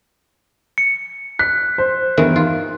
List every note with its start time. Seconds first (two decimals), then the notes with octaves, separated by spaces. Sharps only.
0.78 C#7
1.39 F#6 B6
1.78 C5
2.17 E2 G2 D#3 E3 A#4
2.36 D#4 F4